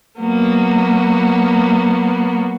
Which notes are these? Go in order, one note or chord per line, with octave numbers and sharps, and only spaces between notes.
F#3 A#3 B3 F#4